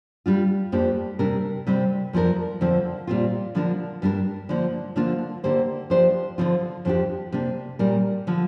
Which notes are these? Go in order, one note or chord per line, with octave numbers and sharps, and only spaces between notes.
G3 D4 F4
F2 F3 A#3 D4 G4
C3 G3 D4 A#4
C3 G3 C4
F2 F3 D4 G4 A#4
F2 D3 F3 C4
A#2 G3 C4 F4
D3 F3 D4 A#4
G2 G3 D4 A#4
D3 F3 A#3
D3 F3 A#3 D4 F4
D3 A#3 G4 C5
F3 D4 G4 C5
D3 F3 C4 F4
F2 F3 D4 G4
C3 A#3 D4
A#2 G3 D4 A#4
D3 F3